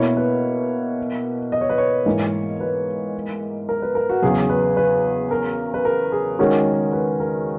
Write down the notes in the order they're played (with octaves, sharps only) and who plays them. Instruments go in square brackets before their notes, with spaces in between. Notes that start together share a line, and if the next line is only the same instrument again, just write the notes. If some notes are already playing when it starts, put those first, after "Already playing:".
Already playing: [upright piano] B2 A#3 E4 [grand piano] C#5
[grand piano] B4
D#5
C#5
B4
C#5
[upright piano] G#2 E3 A#3
[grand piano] B4
A#4
B4
A#4
F#4
[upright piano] E2 C#3 F#3 [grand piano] G#4
[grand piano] B4
B4
A#4
B4
A#4
G#4
[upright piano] D#3 G#3 C#4 F#4 [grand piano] A#4
[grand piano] B4
A#4